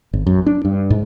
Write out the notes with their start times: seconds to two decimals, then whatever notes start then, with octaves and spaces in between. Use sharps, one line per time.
0.13 G#1
0.27 F#2
0.46 D4
0.65 G2
0.90 G#2